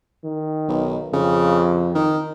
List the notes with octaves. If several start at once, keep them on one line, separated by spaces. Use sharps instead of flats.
D#3
B1
F2 C#3
D#3